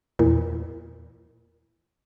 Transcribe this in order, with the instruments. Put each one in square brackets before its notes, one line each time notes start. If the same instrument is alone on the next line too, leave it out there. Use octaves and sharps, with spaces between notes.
[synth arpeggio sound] E2 A#2